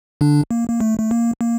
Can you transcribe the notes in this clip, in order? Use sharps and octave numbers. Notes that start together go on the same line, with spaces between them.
D3 D4
A#3
A#3
A3
A3
A#3
A#3